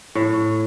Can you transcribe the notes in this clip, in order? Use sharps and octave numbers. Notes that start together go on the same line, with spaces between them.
A2